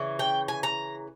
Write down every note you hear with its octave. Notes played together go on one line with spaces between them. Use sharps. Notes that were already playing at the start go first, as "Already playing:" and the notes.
Already playing: C#3 E3
G5
G#5
A#5